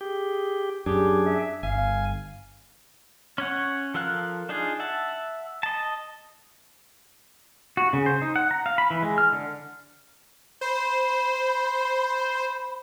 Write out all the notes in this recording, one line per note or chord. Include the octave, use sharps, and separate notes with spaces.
G4 G#4
F#2 D4 G4 G#4
E5
G1 F5 G#5
C#4 C#5 F#5
F3 A4 A#4 F5 F#6
D4 D#4 F4 G#4
E5 F#5 A5
D#5 A5
F#4
C#3
C5
D#4
F#5
A#5
F5
B5
E3
G#3
F6
D3
C5 B5